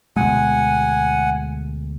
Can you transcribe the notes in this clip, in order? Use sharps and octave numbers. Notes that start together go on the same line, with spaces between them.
D2 B2 G#3 F#5 G#5